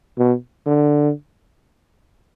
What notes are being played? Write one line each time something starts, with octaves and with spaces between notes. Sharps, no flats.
B2
D3